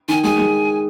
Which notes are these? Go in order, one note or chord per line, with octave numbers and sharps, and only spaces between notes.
D#3 G#5
G#3 G#5
G#3